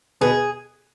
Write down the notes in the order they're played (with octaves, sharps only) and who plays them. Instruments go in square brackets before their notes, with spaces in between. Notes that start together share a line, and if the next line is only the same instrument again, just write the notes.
[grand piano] B2 B3 [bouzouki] G#4